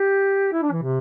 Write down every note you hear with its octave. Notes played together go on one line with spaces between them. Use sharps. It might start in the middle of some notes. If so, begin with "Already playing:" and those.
Already playing: G4
E4
D4
E3
C3